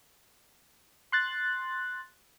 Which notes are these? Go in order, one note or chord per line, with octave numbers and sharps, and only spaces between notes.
C6 F#6 A6